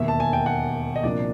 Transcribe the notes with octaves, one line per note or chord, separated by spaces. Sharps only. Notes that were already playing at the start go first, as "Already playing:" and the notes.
Already playing: E1 D#2 D#3 E5
A5
G#5
G5
F#5
D#5
C2 A#2 F3 A#3 D4 D5